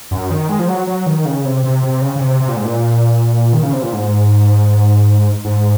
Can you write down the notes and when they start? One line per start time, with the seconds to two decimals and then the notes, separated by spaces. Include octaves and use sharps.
0.11 F#2
0.30 D#3
0.49 G#3
0.59 F3
0.68 F#3
0.87 F#3
1.06 D#3
1.25 C#3
1.45 C3
1.64 C3
1.83 C3
2.01 C#3
2.16 C#3
2.21 C3
2.40 C3
2.48 A#2
2.56 G#2
2.65 A#2
3.53 D#3
3.63 C#3
3.73 C3
3.82 A#2
3.93 G#2
5.45 G#2